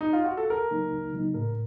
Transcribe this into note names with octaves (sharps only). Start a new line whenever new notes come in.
D#4
F4
F#4
A4
C#2 A#4
C#3 F#3 A#3 D#4
C#2
C#3 F#3 A#3 D#4
A2 A#4